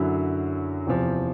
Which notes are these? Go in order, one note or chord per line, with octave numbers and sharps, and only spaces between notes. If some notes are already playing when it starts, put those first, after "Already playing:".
Already playing: F#2 D3 F#3 E4
E2 C3 F3